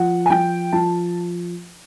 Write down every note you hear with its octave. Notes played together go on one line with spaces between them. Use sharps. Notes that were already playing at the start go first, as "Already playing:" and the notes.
Already playing: F3 F#5
G#5
F3 G5
F3 A5